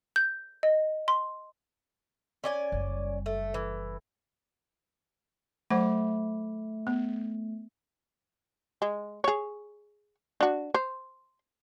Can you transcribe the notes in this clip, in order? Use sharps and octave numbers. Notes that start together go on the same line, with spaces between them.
G6
D#5
C6
C#4 D5 G#5
F#1 G3
A3
E3
F#3 A3 C5 F#5
B3
G#3
G#4 C#5
D4 F#4
C5